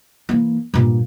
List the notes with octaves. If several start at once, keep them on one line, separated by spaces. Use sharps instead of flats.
E3 A#3
G2 A#2